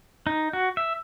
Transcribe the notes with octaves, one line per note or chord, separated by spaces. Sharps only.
D#4
F#4
E5